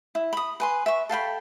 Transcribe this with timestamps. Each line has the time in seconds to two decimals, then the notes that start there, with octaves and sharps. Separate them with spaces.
0.15 E4
0.33 B5 D#6
0.60 B4 G#5 C6
0.86 E5 C#6
1.09 A4 F5 G5 B5